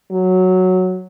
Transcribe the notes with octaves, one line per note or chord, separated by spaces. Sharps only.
F#3